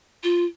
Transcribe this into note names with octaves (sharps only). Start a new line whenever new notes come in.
F4